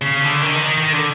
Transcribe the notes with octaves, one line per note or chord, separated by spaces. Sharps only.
C#3
D3
D#3
D#3
D#3
D3